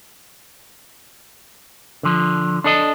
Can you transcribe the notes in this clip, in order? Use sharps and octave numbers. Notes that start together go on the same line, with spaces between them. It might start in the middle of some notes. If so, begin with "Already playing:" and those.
D3 F3
D4 A4 D#5